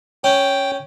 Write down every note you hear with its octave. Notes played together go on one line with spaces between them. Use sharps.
C#4 G5